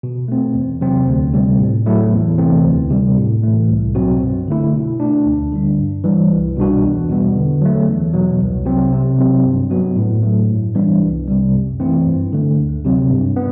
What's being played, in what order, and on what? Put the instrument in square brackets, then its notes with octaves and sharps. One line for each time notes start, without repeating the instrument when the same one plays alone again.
[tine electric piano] B2
A3 C4
E2
C3 F#3 C4
D2
C3 G3 C4
A2
F#3 A3 E4
E2
C3 E3 A3 C4
D2
C3 G3
A2
E3 A3
C2
B2 F#3 C4 F#4
G2
D3 A3 E4
B2
A3 D4
D2
D3 G3 D4
G2
E3 G3
C2
B2 G3 D4 F#4
E2
B2 G3 B3
D3
F#3 A3
E2
B2 F#3
C2
C3 F#3 C4
C3
F#3 C4
G2
F#3 B3 F#4
A2
F#3 A3
G2
E3 G3 B3 D4
C2
C3 G3
F#2
E3 A3 C4 E4
G2
D3 A3
D2
C3 F#3 C4
G2
B3